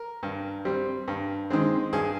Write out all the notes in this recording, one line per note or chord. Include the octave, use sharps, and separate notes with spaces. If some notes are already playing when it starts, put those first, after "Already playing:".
Already playing: A#4
G2
G3 C4
G2
D#3 G#3 C4
G2 G#4